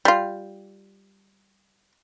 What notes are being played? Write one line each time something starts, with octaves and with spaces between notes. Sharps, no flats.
G3 F4